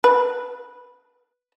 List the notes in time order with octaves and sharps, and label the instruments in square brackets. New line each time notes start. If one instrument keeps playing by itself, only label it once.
[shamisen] B4